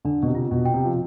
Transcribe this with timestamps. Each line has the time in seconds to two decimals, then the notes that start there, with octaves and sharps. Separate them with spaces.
0.05 D3 D4
0.22 B2
0.27 C3
0.35 F4
0.51 B2
0.65 G5
0.74 C3
0.85 F3